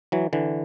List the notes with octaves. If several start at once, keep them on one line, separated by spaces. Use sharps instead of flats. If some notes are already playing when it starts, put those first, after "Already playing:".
E3 F#3
D3 E3